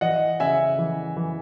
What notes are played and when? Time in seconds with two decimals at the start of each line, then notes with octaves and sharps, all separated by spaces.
0.01 E3 D#5 F#5
0.40 C#3 E5 G#5
0.79 E3
1.17 E3